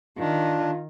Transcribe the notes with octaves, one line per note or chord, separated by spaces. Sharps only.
D#3 D4 F4